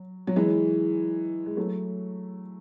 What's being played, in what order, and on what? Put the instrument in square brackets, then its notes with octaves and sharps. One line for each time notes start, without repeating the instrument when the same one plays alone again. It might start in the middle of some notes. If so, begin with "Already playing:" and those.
Already playing: [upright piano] F#3
F#3
E3 G#3
G#3
F#3 A3